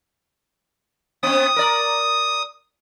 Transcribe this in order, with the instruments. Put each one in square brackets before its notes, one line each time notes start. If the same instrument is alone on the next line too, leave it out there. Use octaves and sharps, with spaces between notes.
[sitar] B3 C4 [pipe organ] D#6
[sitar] A#4 D5